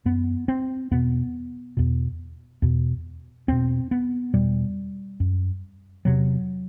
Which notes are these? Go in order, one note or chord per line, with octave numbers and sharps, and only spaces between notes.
F#2 B3
C4
E2 B2 B3
E2 B2
E2 B2
E2 B2 C4
B3
E2 B2 G3
F#2
E2 C3 F#3